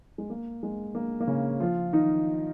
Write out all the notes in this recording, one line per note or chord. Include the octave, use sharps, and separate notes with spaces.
G#3
A#3
G#3
A#3
A#3
C#3 C#4
F3 F4
D#3 D#4